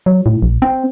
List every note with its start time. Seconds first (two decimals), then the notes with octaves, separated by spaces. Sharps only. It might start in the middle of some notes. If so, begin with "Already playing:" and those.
0.06 F#3
0.26 A2
0.42 A#1
0.62 C4